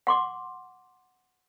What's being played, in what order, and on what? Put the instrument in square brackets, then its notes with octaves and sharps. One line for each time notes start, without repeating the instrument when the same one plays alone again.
[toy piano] F#5 C6 D6